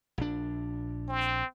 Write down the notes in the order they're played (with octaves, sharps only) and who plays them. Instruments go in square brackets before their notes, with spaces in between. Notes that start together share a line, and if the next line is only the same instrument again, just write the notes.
[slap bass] A#1 D4
[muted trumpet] C4